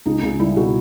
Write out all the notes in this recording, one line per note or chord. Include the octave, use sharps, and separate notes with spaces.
C#2 D#4
C#2
G3 E4
B2 F#4